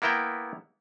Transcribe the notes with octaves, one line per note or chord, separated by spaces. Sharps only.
A#3 B3 E4 A#4 G5